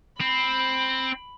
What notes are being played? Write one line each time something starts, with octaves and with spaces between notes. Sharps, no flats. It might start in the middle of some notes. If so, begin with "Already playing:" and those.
C4 B5